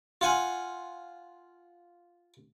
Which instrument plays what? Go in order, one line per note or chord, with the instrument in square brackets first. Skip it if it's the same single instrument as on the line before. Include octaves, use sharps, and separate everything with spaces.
[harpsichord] F4 F#5 G#5